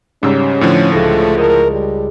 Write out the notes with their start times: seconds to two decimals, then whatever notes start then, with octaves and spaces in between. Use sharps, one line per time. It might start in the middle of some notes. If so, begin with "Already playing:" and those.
0.23 G#2 C#3 G3 C#4 A#5 E6 C#7
0.61 A2 D3 F3
0.92 C#2 A3 D#5 A#6
1.38 A#4 D#5 A5
1.72 G3